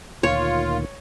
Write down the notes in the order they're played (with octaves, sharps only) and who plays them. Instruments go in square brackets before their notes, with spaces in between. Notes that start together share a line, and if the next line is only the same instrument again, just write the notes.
[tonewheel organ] D2 A#2 D#3 [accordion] F4 [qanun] C#5